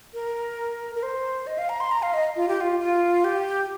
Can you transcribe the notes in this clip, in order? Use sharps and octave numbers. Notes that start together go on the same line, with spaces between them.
A#4
A#4
C5
D#5
F5
A#5
C6
A#5
F5
D#5
F4
G4
F4
F4
G4